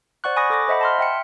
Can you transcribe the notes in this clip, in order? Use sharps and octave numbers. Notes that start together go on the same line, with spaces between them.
C5 D5 F#5 C#6 F#6
G#5 B5 C#6 D#6 F#6 A#6
A4 D6 A#6
C5 D#5 E5 F#5 B5
A5 C6 F6
E5 G5 C#7